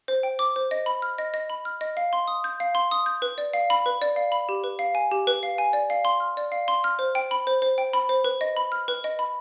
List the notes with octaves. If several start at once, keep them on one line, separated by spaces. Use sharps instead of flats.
C5
G5
D6
C5
D#5
B5
F6
D#5
D#5
B5
F6
D#5
F5
C6
D#6
G6
F5
C6
D#6
G6
B4
D5
F5
B5
B4
D5
F5
B5
G4
B4
F5
G#5
G4
B4
F5
G#5
D5
F5
C6
F6
D5
F5
C6
F6
C5
G5
B5
C5
C5
G5
B5
C5
B4
D#5
B5
F6
B4
D#5
B5